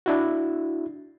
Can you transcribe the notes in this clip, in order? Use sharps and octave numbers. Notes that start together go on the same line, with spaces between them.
D4 E4 F#4